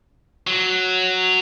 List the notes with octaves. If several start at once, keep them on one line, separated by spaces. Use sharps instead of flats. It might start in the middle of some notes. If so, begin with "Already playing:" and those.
F#3